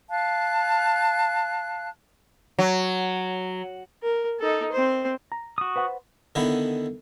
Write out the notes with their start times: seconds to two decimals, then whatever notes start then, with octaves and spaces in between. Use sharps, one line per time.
0.10 F5 A5 F#6
2.59 F#3
4.03 A#4
4.39 D#4 A4
4.72 C4 C5
5.32 A#5
5.58 F#4 D#6
5.76 B4 C5 F#5
6.35 D3 D#3 B3 E4